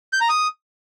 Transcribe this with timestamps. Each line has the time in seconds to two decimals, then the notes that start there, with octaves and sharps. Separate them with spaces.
0.13 G6
0.21 A#5
0.29 D#6